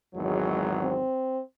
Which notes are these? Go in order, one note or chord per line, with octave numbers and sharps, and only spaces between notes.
G#1 E2 F#3 G#3
C4